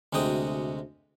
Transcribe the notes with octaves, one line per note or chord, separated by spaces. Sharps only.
D2 C3 G#3 F#4 G5 D#6